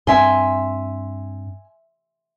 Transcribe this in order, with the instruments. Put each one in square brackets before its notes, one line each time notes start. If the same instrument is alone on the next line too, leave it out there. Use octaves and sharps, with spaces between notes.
[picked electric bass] G2 C4 [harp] E5 C6 [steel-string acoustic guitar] G#5